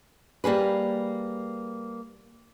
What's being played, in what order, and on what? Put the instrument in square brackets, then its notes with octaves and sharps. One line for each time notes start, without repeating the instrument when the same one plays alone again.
[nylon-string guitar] G3 A#3 G#4 B4